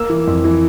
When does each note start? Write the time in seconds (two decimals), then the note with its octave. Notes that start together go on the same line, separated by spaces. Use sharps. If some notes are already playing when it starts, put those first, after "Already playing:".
Already playing: A#3 E6
0.10 E3
0.27 F2
0.44 E3